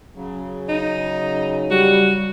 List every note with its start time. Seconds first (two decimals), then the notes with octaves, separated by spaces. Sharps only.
0.15 C#3 F#3
0.69 D#4
1.71 G3 F#4